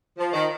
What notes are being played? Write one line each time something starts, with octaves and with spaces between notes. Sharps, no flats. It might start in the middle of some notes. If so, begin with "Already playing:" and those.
F3
D#3